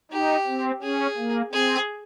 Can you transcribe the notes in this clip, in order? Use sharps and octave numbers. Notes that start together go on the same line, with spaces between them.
D#4 G4
C4
C#4 G#4
A#3
C4 G#4